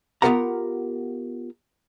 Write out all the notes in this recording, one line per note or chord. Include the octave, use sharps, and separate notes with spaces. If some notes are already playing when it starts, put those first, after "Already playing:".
B3 F4 G4 A#4 F#5 A#5